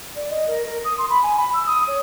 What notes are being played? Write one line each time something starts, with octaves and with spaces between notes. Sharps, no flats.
D5
D#5
A#4
A#4
D#6
C6
B5
G#5
B5
E6
D#6
C#5